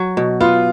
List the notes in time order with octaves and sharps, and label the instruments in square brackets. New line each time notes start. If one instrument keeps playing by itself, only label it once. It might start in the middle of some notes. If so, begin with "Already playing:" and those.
Already playing: [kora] F#3
B2
[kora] B3 [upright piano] F4